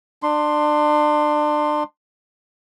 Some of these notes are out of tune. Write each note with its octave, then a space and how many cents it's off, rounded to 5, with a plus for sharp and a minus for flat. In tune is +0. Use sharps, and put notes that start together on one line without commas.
D4 +30 C6 +0